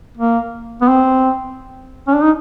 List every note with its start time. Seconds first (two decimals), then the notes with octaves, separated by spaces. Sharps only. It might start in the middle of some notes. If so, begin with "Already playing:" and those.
0.17 A#3
0.81 B3
0.88 C4
2.08 C#4
2.15 D4
2.23 D#4